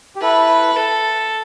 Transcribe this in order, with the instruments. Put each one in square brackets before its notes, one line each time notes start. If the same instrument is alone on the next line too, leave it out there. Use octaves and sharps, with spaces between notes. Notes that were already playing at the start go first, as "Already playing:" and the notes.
[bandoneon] G4
[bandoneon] E4 A4 [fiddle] B4
[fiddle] A4